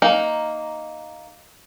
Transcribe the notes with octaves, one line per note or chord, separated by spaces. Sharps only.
A#3 D#4